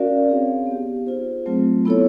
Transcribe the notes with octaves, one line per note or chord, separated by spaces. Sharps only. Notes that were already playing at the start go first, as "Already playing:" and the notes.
Already playing: C#4 F#4 A#4 D5 F5
C4 D#4 G#4 C#5 F5
B3 D#4 G4
F4 G#4 C5
F#3 A3 C4 F4
B3 E4 A4 C#5